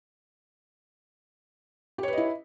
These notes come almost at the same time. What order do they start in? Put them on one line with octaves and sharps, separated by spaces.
G4 C#5 B4 D#5 E4